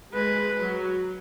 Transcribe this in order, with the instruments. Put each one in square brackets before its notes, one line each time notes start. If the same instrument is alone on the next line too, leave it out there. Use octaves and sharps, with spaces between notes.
[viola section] G#3 [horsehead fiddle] B4
[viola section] F#3